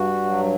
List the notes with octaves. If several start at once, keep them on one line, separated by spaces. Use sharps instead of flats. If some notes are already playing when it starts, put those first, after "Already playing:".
Already playing: G2 F#4
F#3